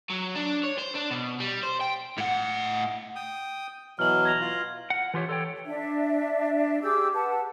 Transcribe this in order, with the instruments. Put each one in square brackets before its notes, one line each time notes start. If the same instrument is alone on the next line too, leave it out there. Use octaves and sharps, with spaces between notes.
[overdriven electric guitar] F#3
D4
C#5
C5
D4
B2
G3
C5
G5
A2 F#5
[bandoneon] G5 D#6
[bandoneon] B2 E3 F#3 [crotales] F6 F#7
[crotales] G#6 A#6 F7
[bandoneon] F4
[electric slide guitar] F#5
E3 F4 G4 C#5
A4 C#5 G5
[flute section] D4 E5
G4 G#4 D6 E6
B4 F#5 A5